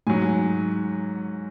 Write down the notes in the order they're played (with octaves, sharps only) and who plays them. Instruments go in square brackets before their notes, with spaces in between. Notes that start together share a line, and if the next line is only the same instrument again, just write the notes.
[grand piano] G#2 F#3 G#5